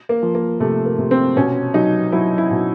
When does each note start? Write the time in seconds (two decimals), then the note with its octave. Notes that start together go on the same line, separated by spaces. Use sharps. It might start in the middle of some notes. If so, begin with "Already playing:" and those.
0.09 A#3
0.22 F3
0.35 A#3
0.60 C3 A3
0.86 A#3
0.98 C3
1.11 C4
1.36 B2 C#4
1.74 F#3 D#4
2.12 F#3 E4
2.38 E4
2.51 B2